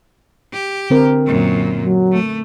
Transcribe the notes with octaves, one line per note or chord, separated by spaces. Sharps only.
G4
D3 C4 A#4
F#2 A#2
F#3
A3